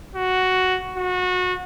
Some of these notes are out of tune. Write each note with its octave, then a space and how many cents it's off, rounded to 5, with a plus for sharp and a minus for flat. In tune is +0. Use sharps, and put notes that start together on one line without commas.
F#4 +5
F#4 -25